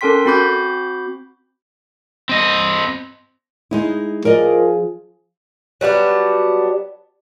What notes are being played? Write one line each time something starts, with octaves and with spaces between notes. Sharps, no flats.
C#4 A4 A#4 G5 C6 B6
C4 F#4 B5 D6 G6
C4 D#5
G#3 D#4 E4
F3 G#4 A#4 D5 D#5
F#3 G3 B3 D4